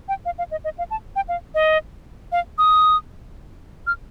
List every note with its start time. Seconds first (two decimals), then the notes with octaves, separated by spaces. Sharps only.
0.08 G5
0.25 F5
0.38 F5
0.51 D#5
0.64 D#5
0.78 F5
0.91 A5
1.16 G5
1.29 F5
1.55 D#5
2.32 F5
2.58 D#6
3.87 F6